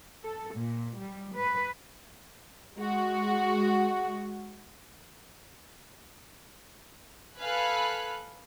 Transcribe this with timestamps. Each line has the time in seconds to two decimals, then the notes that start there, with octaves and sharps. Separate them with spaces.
0.24 A4
0.55 A#2
0.97 G3
1.35 B4
2.77 G#3 F#4
7.39 A4 B4 F5 G#5 B5 F#6